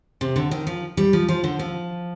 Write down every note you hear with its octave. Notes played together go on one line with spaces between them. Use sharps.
C3
D3
D#3
F3
G3
F3
F3
D3
F3